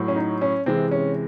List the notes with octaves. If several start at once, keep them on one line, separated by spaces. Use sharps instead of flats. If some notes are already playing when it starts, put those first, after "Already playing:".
Already playing: A2 F#3
C#4
D#4
C#4
C3 E3 G#3 C4
C#4